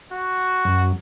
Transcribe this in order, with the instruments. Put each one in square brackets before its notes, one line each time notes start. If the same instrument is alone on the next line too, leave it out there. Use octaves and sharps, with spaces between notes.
[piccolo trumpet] F#4
[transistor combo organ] F#2